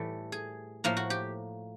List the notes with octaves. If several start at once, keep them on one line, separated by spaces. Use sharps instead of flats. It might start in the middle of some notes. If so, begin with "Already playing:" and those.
Already playing: A2 E3 G3 A4
G#4
A2 F3 A#3 F4
F#4
G4